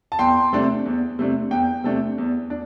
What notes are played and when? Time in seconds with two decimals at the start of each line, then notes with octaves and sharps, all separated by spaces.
0.12 A5
0.19 E2 G5 C6
0.53 C3 A3 D4
0.86 E2
1.19 C3 A3 D4
1.51 E2 G5
1.84 C3 A3 D4
2.18 E2
2.50 D4